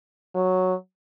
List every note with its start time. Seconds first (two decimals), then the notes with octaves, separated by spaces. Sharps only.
0.35 F#3